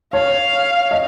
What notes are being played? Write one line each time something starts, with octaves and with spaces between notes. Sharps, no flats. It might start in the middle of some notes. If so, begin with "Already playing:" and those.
C#5 F5
D#5